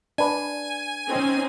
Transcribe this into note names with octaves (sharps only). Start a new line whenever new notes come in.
D4 B4 G#5
C4 C#4 D#4